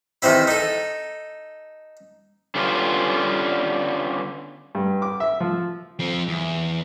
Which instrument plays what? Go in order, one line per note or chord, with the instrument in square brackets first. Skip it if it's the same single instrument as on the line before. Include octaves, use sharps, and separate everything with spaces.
[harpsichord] C3 D#3 E3 C4 E4
D#4 A4
[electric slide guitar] D3 G3 B3 C#4 D4 F4
[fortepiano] G2
D6
E5
F3
[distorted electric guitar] F3 C4
E2